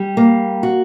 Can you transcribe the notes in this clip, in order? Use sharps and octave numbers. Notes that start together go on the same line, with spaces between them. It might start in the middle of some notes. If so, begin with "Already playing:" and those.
Already playing: G3
A#3
F#4